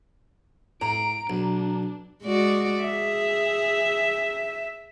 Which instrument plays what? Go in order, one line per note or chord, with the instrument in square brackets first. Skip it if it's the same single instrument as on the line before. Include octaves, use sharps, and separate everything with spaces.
[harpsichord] A2 [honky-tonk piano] A#5 [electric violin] D7
[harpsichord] B1 [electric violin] D4
[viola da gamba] G#3 F#4 D5
[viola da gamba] G#4 [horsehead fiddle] E5